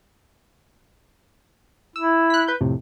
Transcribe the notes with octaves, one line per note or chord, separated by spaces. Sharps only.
E4 E6
F#6 B6
B4 G6
F2 A2 C3